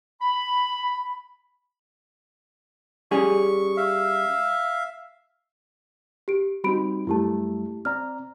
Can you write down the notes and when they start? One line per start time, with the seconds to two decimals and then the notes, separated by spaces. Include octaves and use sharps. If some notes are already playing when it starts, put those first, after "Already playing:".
0.21 B5
3.11 G3 C#4 G#4 C#6
3.77 E5 F5
6.28 G4 D7
6.64 G3 C4 D#4 F#4 B5 D7
7.07 F#2 G3 A3 E4 G4 A5
7.85 C4 D5 A#5 F6